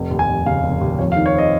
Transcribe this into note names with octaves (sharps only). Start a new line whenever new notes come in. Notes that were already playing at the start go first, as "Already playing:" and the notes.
Already playing: F1
D#2
G#5
F1
C#3 F5
F1
D#2
F2 C#5
F5
D#3
C#5
C4 D#5